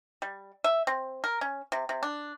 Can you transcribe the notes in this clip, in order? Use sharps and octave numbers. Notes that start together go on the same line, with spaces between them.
G3
E5
C4
A#4
C#4
C3
C3
D4